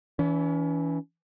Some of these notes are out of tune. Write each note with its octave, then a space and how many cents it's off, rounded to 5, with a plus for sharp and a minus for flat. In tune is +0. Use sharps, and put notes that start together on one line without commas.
E3 -10 C#4 +40